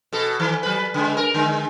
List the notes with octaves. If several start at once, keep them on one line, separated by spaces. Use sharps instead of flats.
B2 A4
D#3
F#3 B4
C#3 G#3
A#4
D3 G#3